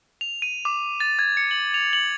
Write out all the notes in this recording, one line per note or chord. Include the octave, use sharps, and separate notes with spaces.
F7
D#7
D6
A6
G#6
C#7
F#7
F7
F#7